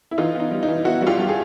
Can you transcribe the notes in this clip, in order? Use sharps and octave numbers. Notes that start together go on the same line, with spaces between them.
E4
E3 D#4 F4
B3 D#4
G3
D#4
E3
B3 E4 F#4
G3 F#4
F4 G4
G2
G#4